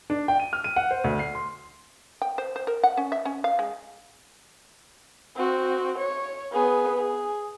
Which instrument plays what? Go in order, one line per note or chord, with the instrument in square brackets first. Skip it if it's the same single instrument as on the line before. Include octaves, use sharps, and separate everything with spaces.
[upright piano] D4
G5
D#7
F6
D#7
F#5
C5
D2
C7
C6
[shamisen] G5
C5
C5
A#4
F#5
C#4
E5
C#4
F5
G#3
[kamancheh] C4 F#4
C#5
B3 G#4
G#4